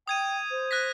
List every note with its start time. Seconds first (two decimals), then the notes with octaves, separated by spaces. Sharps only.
0.08 G5 D#6 G#6 D#7
0.51 C5
0.71 F#6 A#6 B6